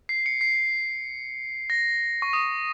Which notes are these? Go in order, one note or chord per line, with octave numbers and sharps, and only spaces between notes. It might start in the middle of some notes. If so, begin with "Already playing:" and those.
C7
C#7
C7
A#6
C#6
D#6